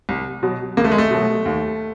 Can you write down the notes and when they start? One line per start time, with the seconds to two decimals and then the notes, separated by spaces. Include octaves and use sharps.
0.09 C2
0.43 B2 F#3
0.77 C#2 A#3
0.84 A3
0.92 G#3
0.98 A3
1.11 B2 F#3
1.45 D#2